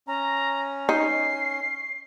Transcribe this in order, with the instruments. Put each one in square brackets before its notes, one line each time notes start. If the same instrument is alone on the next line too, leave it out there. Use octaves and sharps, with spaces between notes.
[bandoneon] C#4 [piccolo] A#5
[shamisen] D#4 [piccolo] C7